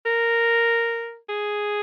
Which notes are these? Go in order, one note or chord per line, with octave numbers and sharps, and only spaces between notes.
A#4
G#4